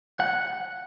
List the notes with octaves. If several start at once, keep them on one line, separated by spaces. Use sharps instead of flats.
F#5